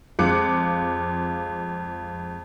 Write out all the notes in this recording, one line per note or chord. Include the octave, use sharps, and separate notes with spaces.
F2 G#3 F4 D6 F#6 C#7